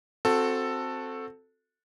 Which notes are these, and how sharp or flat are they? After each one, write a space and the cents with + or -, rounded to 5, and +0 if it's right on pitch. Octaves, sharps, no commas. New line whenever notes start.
C4 +0 F#4 -15 A4 +5